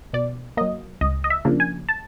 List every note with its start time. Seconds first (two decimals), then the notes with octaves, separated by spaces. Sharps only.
0.13 B2 D5
0.57 F#3 A#3 D#5
1.01 C#2 D#5
1.24 D#5
1.30 E5
1.45 C#3 F3 A#3 D4
1.60 G#5
1.89 A5